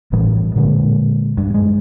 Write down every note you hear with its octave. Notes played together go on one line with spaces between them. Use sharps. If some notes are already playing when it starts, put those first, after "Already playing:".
A1 A2 E3 G3
A#2 D3 G#3
G2
G#3